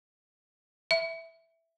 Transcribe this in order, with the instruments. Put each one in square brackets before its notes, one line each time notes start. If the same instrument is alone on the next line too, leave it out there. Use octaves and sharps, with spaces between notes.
[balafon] E5